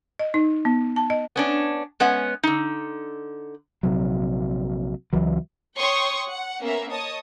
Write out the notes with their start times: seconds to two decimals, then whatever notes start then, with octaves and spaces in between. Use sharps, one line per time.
0.19 D#5
0.34 D#4
0.65 B3
0.96 A5
1.10 D#5
1.36 B3 C#4 D4
2.00 G#3 B3 C#4 F#5
2.43 D3 D#4
3.83 A#1 C3 F#3
5.13 C#2 E3 F#3
5.76 C#5 G5 C6 C#6 D#6
6.28 F#5
6.61 A#3 B3 C#4 A#4 E5
6.91 C#5 D#5 A5 D#6